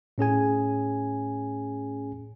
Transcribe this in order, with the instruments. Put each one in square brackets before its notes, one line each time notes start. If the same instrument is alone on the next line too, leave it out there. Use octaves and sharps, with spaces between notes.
[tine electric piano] A2 C#4 G#4 G#5